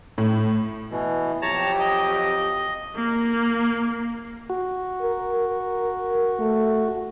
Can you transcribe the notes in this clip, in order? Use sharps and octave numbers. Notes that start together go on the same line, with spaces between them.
A2
B2 E3
F2 F#3 G4 C#5 A5 A#5
D#5
A#3
F#4
A#4
A#4
A3